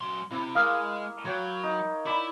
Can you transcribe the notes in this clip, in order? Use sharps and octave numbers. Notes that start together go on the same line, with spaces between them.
F#2 C6
C3 E4
G#3 A#3 F5 D#6 F6
F#3 C#5 G5
D#4
E4 D5 B5